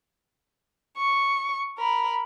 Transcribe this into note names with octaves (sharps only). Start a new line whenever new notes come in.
C#6
A#4 B5